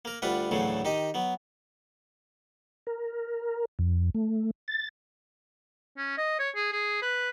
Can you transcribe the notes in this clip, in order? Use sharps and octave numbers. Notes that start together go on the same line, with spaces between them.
A#3 A#4
D2 G3 F4 B4 D5 F#5
D2 A2 C#3 E3 F#3 A3
D#3 D#4 G4 D#5
F#3 B3
A#4
F2
A3
A6
C#4
D#5
C#5
G#4
G#4
B4